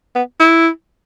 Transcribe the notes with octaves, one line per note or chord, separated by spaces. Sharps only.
B3
E4